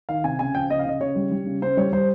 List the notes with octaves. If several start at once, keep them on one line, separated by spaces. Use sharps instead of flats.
D#3 F5
C3 G#5
C#3 G#5
F3 G5
C#3 D#5
F5
C#3 D#5
C#3 C#5
G3
G3
C#3
C#3 C5
G3 C#5
G3 C5